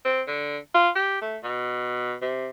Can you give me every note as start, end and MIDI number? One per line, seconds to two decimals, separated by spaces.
0.05 0.21 60
0.27 0.57 50
0.74 0.89 65
0.95 1.19 67
1.21 1.37 57
1.43 2.14 47
2.21 2.49 48